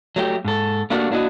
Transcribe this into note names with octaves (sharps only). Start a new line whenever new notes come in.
F#3 A3 G4
G#2 A4
A3 A#3 D4 F#4 G4 A#4
A#3 D4 E4 F#4 D#5